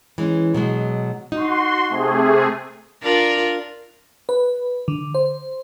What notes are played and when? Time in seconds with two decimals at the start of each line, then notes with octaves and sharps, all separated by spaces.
0.18 E3 G#3 C#4
0.54 B2 F#3 G#3
1.32 D#4 F#4 C6
1.89 C3 A3 G#4
3.03 D4 F4 A#4
4.29 B4
4.88 D3
5.15 C5